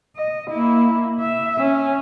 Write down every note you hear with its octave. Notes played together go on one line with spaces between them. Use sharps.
D#5
A#3 E4
E5
C#4